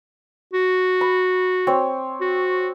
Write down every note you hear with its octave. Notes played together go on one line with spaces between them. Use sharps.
F#4
B5
C4 C5 C#5
F#4